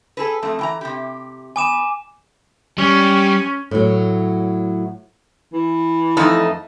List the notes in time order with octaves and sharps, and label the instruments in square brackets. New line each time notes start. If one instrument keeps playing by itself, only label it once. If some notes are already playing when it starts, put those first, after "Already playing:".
[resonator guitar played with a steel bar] G#4 A4 B4
F2 A3
E3 G5 A#5
C3 G4
[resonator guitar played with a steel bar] B3 [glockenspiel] G#5 D6 E7
[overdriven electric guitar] G3 [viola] C#4
[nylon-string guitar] A2 F#3
[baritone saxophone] E3
[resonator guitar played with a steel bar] F2 A3 D#4